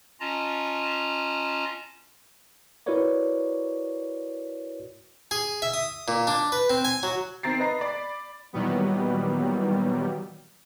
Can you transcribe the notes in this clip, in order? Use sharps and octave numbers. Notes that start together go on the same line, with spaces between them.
C#4 F4 D#5 A5 A#5
E4 F#4 A#4 B4 C#5 D5
G#4
E5
D#6
A#2
D4
B4
C4
G#5
F#3
D#3 C4 A#5 A6 C7
B4 D#5 A#5
D5 B5
A#2 D#3 E3 F#3 G3 B3